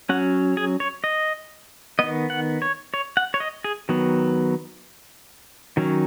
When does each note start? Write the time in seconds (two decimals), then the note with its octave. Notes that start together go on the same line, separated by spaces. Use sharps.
0.09 F#3 C#4 F#5
0.57 G#4
0.80 C#5
1.04 D#5
1.99 D#3 B3 D#5
2.30 F#5
2.62 C#5
2.94 C#5
3.17 F#5
3.34 C#5
3.40 D#5
3.64 G#4
3.89 D#3 F#3 B3
5.77 D#3 F#3 C#4